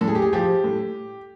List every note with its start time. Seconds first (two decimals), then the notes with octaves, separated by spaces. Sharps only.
0.01 A2 A4
0.08 G#4
0.15 G4
0.22 G#4
0.33 F3 G4
0.64 A2